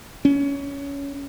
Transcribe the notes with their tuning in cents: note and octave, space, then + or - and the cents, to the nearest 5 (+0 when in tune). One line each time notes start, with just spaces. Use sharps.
C#4 +20